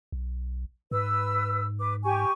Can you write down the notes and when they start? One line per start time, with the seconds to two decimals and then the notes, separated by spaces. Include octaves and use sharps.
0.12 B1
0.91 G#2 B4 E6
1.79 B4 D6
2.04 G4 G#5 C#6